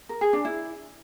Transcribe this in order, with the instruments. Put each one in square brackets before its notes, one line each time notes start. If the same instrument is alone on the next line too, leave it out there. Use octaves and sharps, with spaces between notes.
[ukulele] A#4
G#4
D4
E4